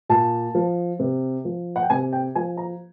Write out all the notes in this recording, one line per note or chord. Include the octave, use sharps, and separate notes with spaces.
A#2 A5
F3
C3
F3
F#5
G5
C3 G#5
G5
F3 G#5
A#5